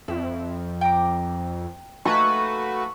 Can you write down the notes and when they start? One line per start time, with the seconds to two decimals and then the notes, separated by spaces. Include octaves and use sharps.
0.08 F2 E4
0.81 G5 A#5 D6
2.05 A3 A#3 F#4 B4 G#5 C#6